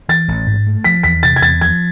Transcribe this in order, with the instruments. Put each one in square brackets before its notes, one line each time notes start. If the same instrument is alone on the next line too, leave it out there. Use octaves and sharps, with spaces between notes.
[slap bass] E3 [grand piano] A6
[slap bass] A1
G#2
A3
[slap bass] F3 [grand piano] B6
[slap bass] E2 [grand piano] B6
[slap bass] C3 [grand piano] A6
[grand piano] G#6
[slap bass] E2 [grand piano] A6
[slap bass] F3 [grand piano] G#6